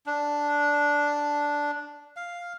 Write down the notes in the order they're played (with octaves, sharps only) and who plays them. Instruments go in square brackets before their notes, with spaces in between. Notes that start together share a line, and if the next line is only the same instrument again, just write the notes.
[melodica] D4
F5